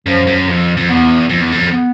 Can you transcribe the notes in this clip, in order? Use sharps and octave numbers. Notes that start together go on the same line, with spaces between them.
F#2 F3
F#2
F2
F2
E2 B3
F2
E2
F2
B3